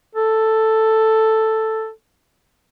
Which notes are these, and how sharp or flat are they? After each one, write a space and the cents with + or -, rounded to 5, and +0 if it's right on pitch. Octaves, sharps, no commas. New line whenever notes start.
A4 +5